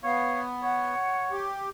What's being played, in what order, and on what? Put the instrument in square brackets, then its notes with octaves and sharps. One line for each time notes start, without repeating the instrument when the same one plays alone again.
[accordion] B3 [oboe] C#5 [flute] F5
[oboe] C#5 [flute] F#5
[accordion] G4